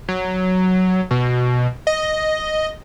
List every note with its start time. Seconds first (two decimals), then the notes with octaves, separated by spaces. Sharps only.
0.08 F#3
1.11 B2
1.87 D#5